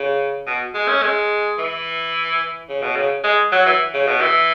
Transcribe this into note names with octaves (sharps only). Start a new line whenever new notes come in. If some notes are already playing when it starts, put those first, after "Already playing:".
Already playing: C#3
B2
G#3
C#4
G#3
E3
C#3
B2
C#3
G#3
F#3
E3
C#3
B2
E3